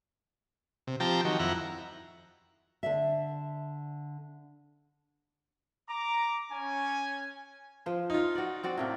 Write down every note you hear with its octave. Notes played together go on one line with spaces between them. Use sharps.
C3
F3 C4 G4 G5 A5 A#5
D#3 F#3
F2 E4 F#5 A#5
D3 D5 E5
A#5 D6
C#4 G#5
F3 C5
D#4 F4
F#4 D5
C4 F#4 D5
A2 C3 A#3